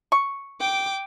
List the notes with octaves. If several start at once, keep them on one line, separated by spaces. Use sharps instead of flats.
C#6
G5 D6